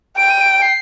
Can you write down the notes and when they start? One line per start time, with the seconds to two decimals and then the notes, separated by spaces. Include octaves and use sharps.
0.17 G5 D7
0.30 D#7
0.41 D7
0.62 C7